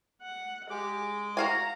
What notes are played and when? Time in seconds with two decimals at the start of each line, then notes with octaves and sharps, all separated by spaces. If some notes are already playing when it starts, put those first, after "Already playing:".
0.22 F#5
0.70 G#3 G4 D6
1.00 G#4
1.37 F#4 F5 G#5 A#5